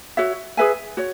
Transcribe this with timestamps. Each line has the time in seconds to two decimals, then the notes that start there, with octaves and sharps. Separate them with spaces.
0.17 F#4 C#5 E5
0.57 G#4 B4 E5 G#5
0.97 F#4 C#5